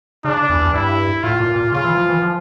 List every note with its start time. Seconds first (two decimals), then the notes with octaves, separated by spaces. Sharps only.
0.25 C#3 D4
0.49 E2
0.61 E2
0.73 G2 E4
1.23 A2 F4
1.40 A#2
1.56 A#2
1.72 C#3 F4
1.84 E3
1.97 F3
2.09 E3
2.22 F3